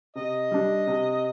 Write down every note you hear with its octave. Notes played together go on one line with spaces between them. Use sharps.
C3 D#5
G3 D4
C3